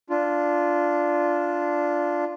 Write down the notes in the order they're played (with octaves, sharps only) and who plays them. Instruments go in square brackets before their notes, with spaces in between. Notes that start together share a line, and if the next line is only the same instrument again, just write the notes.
[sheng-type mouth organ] D4 F4